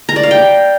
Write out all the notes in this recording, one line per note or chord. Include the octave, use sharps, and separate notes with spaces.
A#5
D5
F5
G5